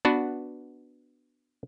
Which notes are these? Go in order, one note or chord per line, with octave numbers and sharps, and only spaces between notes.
B3 D4 F#4 B4